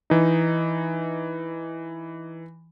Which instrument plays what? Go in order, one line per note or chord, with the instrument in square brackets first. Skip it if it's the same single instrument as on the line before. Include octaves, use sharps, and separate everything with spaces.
[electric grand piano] E3 D#4